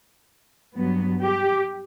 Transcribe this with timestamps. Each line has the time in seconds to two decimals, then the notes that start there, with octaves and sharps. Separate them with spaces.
0.76 G2 F#3 B3
1.22 G4